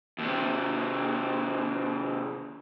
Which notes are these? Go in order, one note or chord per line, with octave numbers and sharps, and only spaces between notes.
D#2 C3